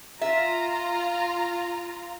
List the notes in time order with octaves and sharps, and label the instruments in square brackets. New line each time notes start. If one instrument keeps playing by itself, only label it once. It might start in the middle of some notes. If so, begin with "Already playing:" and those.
[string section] F4 A#5 [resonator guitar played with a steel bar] E5